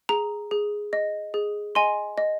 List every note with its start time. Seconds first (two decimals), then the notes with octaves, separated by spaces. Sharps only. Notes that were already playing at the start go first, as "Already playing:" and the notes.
0.09 G#4 A#5
0.51 G#4
0.93 D#5
1.34 G#4
1.75 D#5 G#5 C6
2.18 D#5